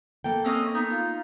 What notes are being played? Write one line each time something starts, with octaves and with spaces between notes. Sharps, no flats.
A#3 A4 G5
C4 C#4 D#5
B3 D#4
F4